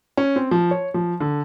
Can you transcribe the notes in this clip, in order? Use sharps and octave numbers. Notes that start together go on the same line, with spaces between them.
C#4
C4
F3
C#5
F3
D3